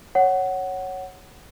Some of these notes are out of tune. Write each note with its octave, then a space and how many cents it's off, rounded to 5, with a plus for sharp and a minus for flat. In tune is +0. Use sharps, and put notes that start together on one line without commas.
C#5 -5 F#5 +10